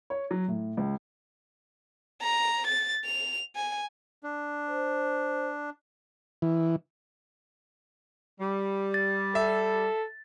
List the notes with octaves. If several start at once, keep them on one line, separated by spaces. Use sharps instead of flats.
C#5
F#3
A2
C#2
A#5
A6
F7
G#5
D4
C5
E3
G3
A6
A4 E5